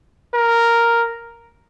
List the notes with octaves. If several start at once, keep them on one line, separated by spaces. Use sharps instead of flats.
A#4